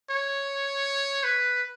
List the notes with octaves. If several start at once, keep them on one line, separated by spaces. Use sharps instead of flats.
C#5
B4